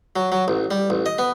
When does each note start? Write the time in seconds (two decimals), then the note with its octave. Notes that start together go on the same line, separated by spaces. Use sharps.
0.16 F#3
0.32 F#3
0.48 A1
0.71 G3
0.90 A1
1.06 D#5
1.18 B3